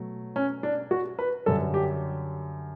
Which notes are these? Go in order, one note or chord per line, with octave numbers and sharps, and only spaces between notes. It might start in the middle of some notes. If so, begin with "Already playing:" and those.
Already playing: B2 F#3 A3
C#4
D4
F#4
B4
F#2 D3 G3 A4
G4